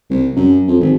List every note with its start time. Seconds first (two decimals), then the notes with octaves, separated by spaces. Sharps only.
0.10 C2
0.36 F#2
0.68 F2
0.81 G#1